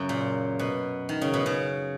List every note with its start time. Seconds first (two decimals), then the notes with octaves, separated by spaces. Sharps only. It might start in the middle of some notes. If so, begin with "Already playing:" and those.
Already playing: F#2 C#3
0.09 A#2
0.59 B2
1.09 D#3
1.22 C#3
1.34 B2
1.46 C#3